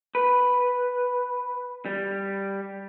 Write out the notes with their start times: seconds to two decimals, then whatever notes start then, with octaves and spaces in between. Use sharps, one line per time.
0.15 B4
1.85 G3